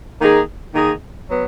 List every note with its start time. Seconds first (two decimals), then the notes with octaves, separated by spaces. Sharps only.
0.21 D#3 A#3 D#4 G#4
0.73 D#3 A#3 D#4 G#4
1.28 F#3 B3